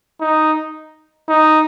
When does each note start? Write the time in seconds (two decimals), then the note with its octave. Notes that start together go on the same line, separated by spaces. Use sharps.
0.21 D#4
1.29 D#4